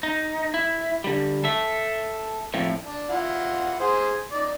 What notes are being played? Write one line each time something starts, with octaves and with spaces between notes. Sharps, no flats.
D#4
E4
D3 G3
A4 E5
F2 A2
D4
E4 F4 F#5
G#4 C5
D#4 D5